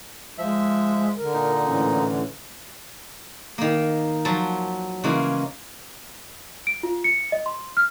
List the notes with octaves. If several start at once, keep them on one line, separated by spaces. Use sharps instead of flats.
F3 G#3 E5
D3 A#4
A#2 D#4
A2 E3 C#4
D#3 A#3
F3 F#3 A5
C#3 E3 G#3 A#3 C#4
D7
F4
C#7
D#5
C6
F6